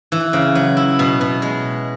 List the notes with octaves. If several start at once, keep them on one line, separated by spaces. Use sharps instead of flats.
E3
C#3
F#3
E4
B2
B2
G#3